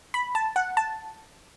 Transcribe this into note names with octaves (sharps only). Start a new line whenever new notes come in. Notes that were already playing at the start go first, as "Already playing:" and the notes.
B5
A5
F#5
A5